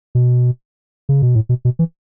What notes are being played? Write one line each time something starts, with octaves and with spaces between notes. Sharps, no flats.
B2
C#3
B2
A2
B2
B2
E3